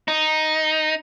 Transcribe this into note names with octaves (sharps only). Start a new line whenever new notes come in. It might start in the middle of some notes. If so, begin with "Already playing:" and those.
D#4